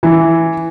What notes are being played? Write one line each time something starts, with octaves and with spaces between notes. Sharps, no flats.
E3